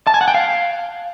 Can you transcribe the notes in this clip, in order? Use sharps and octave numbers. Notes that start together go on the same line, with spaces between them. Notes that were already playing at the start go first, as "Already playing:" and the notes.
A5
G#5
F#5
G5
F5